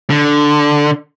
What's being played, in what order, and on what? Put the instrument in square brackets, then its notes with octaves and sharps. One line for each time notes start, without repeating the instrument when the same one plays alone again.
[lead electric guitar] D3